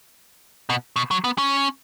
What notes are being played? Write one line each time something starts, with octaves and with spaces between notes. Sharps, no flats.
B2
B2
F#3
B3
C#4